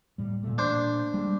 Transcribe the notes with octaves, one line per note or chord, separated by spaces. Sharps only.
A2 G3
A#2 A3
D4 C5
G3 G#3 A#3